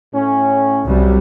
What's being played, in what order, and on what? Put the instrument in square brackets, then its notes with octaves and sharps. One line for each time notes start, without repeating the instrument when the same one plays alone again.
[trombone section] A2 C#4
[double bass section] C2 F#3 G3